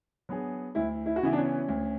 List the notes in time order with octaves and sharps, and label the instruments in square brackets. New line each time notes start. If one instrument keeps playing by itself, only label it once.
[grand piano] F#3 B3 D4 G#4
[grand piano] D2 [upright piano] E4
[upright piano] E4
F#4
[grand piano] C#3 E3 B3 [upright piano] E4
[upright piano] D4
C#4
[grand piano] D2